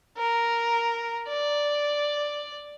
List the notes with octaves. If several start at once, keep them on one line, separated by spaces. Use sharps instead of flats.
A#4
D5